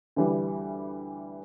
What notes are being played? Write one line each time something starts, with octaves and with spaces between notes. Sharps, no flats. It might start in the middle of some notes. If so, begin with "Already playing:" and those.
D2 E3 G3